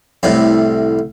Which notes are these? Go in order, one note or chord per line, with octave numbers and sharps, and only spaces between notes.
C2 A2 C3